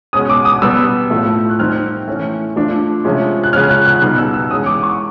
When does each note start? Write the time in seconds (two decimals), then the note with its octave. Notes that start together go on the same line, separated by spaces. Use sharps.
0.13 B2 G#3 C#4 D#6
0.29 D6
0.45 D#6
0.62 B2 G3 B3 E6
1.10 A2 F3 A3
1.49 F#6
1.59 D#3 G3 C4 D#4 F6
2.07 E3 A3 C#4
2.56 F3 A3 D4
3.05 C3 F3 G#3 C#4
3.44 F#6
3.53 C#3 F3 G#3 C#4 F6
3.69 F#6
3.86 F#6
4.01 B2 G3 B3 D#4 F#6
4.18 E6
4.34 E6
4.50 E3 G#3 C#4 D#6
4.66 D6
4.83 C#6